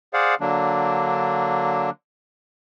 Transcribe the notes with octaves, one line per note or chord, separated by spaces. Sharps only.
G#4 C5 D5 F5 F#5
D3 F#3 A#3 D4